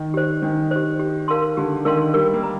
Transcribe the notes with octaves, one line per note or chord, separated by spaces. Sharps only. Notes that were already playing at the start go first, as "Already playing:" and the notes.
Already playing: D#3
G4 C5
D#3 D4
G4 C5
G4
A#4 F5 A5 C6
D3 G4
D#3 A#4 F5 A5 C6
G3 A#4
A#3
A#5